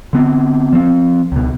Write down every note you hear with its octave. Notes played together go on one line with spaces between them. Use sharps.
D3 B3 C4
F3 C4
C#2 B2